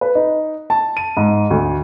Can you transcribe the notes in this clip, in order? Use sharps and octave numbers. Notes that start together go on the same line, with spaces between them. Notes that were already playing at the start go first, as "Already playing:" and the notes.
B4
D#4
A5
D#7
G#2
D2